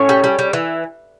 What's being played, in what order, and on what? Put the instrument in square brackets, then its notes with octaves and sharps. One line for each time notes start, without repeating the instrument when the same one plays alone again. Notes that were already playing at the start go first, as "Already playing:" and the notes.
Already playing: [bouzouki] A2 C#4 C#5
G3
G3
G3
E3